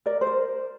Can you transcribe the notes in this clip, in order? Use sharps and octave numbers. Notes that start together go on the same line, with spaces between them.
A#4 D5
C5
A#4